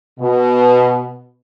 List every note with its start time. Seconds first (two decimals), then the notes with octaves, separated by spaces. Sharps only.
0.20 B2